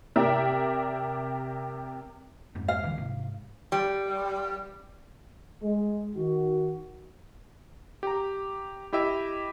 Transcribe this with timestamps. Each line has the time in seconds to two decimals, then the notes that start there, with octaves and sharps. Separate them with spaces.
0.16 C3 G4 A#4 D5 E5
2.55 F2 G#2
2.68 F5
2.83 C2 D3 E3
2.97 G#2 C3
3.72 G3
5.63 G#3
6.15 D#3 F#4
8.03 G4 A#5
8.93 E4 G4 D#5 E5